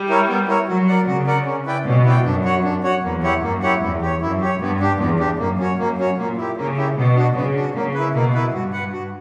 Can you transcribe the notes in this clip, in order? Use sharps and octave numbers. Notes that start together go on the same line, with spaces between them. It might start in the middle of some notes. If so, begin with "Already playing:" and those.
Already playing: G3
E4 A#4 C#5
B3
E4 A#4 C#5
F#3 F#4
A#4 D5 F#5
C#3 F#4
A#4 D5 F#5
C#4
E4 B4 D5 G5
B2 C#4
E4 B4 D5 G5
F#2 D4
F#4 C#5 F#5
D4
F#4 C#5 F#5
E2 A#3
E4 G4 C#5 F#5
F#2 A#3
E4 G4 C#5 F#5
E2 E4
G4 C#5
F#2 E4
G4 C#5
G2 B3
D4 G4
E2 B3
D4 G4
F#2 A#3
C#4 F#4 C#5
F#2 A#3
C#4 F#4 C#5
A#2 A#3
E4 G4
C#3 A#3
E4 G4
B2 B3
D4 F#4
C#3 B3
D4 F#4
C#3 A#3
E4 B4
B2 A#3
E4 B4
G2 F#4
B4 F#5
F#4